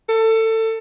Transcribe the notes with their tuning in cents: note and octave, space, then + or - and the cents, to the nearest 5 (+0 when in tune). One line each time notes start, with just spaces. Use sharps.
A4 +25